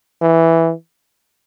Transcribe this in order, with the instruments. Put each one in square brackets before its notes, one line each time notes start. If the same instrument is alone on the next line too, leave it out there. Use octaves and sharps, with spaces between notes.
[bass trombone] E3